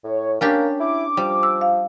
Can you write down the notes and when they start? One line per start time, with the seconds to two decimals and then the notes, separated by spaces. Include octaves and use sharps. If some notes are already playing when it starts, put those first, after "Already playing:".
0.04 A2 C#5
0.41 A#3 C#4 D4 G4 A#4
0.80 E4 D6
1.17 F3 G3
1.43 E6
1.61 F5